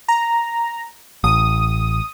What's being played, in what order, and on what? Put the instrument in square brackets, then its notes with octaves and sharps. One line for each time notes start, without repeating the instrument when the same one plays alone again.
[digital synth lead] A#5
[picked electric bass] A1 [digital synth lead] D#6